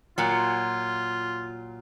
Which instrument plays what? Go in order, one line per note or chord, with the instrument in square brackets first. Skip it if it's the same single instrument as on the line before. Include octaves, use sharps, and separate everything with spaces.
[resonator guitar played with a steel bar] A#2 F#3 [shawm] F4